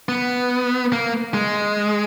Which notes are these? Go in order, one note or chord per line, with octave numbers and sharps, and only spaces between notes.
B3
A#3
G#3